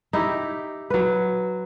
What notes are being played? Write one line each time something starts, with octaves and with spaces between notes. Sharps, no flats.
D#4 E4 G4
F#3 B4